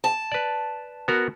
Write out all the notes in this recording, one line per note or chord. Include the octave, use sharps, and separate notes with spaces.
A5
B4 D5
B3 F#4 A#4